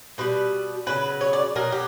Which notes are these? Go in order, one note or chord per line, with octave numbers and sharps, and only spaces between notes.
B2 G3 B4
C#3 F#3 B4
C#5
D5
B2 F#3 A#4
G4